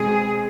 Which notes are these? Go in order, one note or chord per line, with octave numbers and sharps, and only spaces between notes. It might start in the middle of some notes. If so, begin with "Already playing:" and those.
Already playing: B2 G#3 C4 G#4